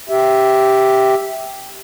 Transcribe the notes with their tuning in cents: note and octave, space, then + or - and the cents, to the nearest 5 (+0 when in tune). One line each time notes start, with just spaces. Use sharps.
G4 -5 E5 +0